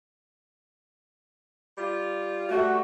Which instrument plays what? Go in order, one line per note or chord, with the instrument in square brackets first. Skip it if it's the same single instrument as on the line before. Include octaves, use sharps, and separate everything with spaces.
[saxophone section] G3 F4
[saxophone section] G3 A3 [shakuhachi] F#4